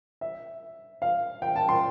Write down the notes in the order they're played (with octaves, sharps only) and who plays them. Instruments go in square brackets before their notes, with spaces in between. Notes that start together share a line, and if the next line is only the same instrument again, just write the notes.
[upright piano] E5
F5
G5
A5
C6